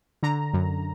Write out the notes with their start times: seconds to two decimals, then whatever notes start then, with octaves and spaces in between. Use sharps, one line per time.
0.23 D3 A#5
0.53 F#2